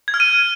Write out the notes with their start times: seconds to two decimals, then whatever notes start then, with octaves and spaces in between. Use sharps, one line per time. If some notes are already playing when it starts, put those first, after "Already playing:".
0.08 G#6
0.14 F6
0.20 D#7